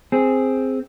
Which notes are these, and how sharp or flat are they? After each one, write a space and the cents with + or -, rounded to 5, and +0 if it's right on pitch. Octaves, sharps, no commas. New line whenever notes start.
C4 +0 G#4 +0